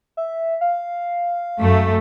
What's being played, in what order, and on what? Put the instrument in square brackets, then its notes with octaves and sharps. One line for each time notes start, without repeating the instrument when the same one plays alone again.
[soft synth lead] E5
F5
[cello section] F#2 A3